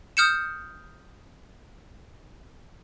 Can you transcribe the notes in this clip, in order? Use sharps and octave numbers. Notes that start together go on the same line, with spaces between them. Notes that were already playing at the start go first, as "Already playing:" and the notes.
D#6 F6 G6 C#7 E7